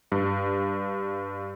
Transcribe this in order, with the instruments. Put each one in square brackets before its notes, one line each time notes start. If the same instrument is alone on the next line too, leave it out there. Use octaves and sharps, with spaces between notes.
[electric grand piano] G2